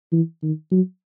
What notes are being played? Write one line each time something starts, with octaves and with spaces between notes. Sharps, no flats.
E3
D#3
F#3